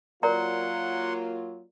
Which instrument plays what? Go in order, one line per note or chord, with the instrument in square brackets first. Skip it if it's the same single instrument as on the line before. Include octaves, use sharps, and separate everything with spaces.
[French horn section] F#3 A#3 F4 [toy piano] A#4 D5 A#5 [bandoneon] F#5 C6